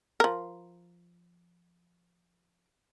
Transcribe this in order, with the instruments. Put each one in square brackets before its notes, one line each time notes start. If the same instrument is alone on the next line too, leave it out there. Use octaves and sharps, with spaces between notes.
[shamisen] F3 A#4